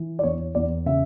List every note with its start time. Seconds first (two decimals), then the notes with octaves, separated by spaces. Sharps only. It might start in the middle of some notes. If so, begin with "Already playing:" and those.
Already playing: E3
0.19 D5
0.23 E2 C#5
0.55 E2 D5
0.86 C#3 E5